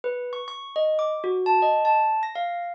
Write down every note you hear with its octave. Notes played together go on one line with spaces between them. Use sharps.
B4
C#6
C#6
D#5
D6
F#4
A5
D#5
A5
A#6
F5